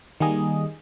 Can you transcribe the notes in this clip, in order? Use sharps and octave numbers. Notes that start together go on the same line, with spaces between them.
D#3 G3 A#3 G#4 D#5